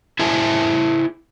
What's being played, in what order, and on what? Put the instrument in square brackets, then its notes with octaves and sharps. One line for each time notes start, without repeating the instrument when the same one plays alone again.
[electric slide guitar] E4 G#4 C5 E5 G#5 A5